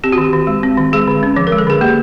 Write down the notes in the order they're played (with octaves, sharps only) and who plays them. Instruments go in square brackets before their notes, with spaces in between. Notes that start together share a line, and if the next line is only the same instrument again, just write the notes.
[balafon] C4 G4
F#4
D#3 G4
D#3
G#3
C4
D#3
G#3 G#4
D3
C#4
F3
A#4
G#3
A4
D3 G#4
A#3 G4